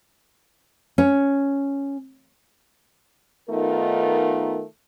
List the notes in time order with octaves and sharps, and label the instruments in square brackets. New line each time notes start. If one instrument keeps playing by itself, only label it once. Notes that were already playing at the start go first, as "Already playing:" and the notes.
[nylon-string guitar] C#4
[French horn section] D#3 A3 B3 D#4 F4 A#4